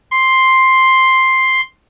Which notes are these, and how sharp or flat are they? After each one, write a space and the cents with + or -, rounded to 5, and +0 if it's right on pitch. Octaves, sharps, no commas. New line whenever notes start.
C6 +5